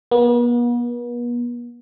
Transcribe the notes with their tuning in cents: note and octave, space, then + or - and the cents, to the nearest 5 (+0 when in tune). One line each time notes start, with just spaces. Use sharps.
B3 -45